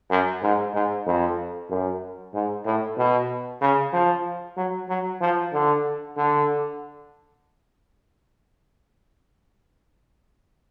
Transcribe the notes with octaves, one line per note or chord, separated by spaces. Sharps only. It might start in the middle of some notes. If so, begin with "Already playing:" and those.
F#2
G#2
G#2
F2
F#2
G#2
A2
B2
C#3
F3
F#3
F#3
F3
D3
D3